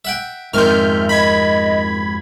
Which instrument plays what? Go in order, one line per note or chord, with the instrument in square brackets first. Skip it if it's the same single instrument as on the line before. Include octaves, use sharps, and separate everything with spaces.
[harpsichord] E5 F#5 G5
[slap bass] F2 G#2 [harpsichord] D#3 C4 [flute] E5 [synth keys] F6 G6
[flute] D#5 [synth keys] B5 G#6